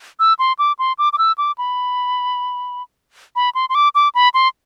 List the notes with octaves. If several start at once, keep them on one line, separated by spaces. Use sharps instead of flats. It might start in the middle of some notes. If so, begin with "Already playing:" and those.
E6
C6
D6
C6
D6
D6
E6
D6
B5
B5
C6
C6
D6
D6
B5
C6